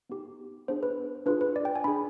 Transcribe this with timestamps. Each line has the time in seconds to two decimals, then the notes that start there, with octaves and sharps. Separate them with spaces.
0.09 B3 D#4 G4
0.68 B3 D4 G#4 C5
0.83 B4
1.26 D4 F4 G#4 B4
1.41 B4
1.56 D5
1.65 G5
1.75 G#5
1.84 D4 G#4 B5